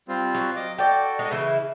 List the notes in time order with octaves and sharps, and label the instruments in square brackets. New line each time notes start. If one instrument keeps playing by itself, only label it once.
[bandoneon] G3 C4 F4
[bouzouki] F#3
[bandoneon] D#5 D6
[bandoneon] F#4 A4 [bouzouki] D5 G5
[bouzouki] G#3 D#4
C#3 E3 E4